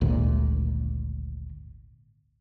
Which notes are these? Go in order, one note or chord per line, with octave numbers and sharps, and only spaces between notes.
G#1 D2 A#2